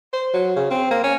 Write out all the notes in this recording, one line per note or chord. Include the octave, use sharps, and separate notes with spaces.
C5
F#3
C#3
C4
A#3
C#4